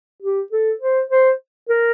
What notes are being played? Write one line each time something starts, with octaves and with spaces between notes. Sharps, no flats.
G4
A4
C5
C5
A#4